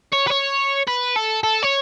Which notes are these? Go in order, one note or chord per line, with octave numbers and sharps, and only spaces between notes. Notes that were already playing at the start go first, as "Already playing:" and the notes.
C#5
B4
C#5
B4
A4
A4
C#5